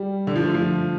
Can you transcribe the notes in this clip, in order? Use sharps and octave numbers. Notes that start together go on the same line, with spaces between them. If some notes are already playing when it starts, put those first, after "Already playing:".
Already playing: G3
D3
F3
A3
F3